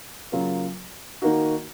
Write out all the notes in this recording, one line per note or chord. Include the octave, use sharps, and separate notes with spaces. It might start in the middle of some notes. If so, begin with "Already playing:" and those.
C#3 F#3 A#3 F4
D#3 A#3 D#4 F#4